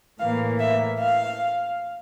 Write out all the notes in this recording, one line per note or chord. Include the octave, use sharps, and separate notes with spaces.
A2 E3 A#3 F5
E5
F5